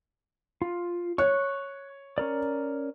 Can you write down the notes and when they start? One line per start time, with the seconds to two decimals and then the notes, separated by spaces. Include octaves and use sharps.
0.62 F4
1.18 C#5 C#6 F#6
2.18 C#4 A#4 D5